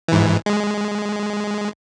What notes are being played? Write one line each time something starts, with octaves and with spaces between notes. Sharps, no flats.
G#2 E3
G#3